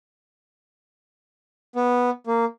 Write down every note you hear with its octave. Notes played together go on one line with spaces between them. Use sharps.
B3
A#3